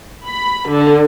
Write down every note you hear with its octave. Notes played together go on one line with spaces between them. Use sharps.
B5
D3